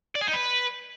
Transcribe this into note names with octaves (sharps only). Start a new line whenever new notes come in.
D5
G#4
D#4
B4